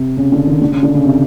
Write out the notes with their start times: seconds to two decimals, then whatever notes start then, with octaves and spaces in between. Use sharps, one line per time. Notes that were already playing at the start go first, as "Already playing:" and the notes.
Already playing: C3
0.17 C#3
0.32 D3
0.47 D#3
0.62 D3
0.72 C#3
0.83 D3
0.94 C#3
1.05 C3